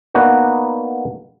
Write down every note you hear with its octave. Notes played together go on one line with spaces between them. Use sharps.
A#3 B3 D4 D#4 F#4 B4